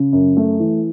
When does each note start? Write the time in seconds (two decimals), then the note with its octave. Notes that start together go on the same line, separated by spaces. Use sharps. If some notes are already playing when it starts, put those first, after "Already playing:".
Already playing: C#3
0.12 F#2
0.37 A3
0.59 E3